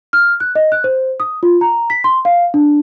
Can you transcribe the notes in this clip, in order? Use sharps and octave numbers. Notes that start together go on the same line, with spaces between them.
F6
F#6
D#5
F#6
C5
D#6
F4
A#5
B6
C6
F5
D4